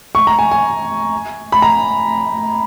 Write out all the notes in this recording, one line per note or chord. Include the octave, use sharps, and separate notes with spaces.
C#6
A#5
G#5
G#5
B5
A#5